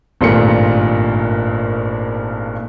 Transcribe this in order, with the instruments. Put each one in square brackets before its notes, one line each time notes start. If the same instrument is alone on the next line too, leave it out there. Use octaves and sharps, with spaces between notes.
[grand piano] G#1 G2 A#2 A3 C#7